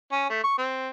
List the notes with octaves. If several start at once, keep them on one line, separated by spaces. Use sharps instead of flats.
C#4
A3
C#6
C4